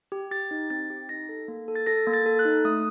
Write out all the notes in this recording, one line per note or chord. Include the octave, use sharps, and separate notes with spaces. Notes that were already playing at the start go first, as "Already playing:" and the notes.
G4
G4 A6
D#4
C4 A6
G4
D#4 A#6
A4
A#3
A4
A6
A4 A#6
A#3
A6
A4
F#6
D#4
A3 D#6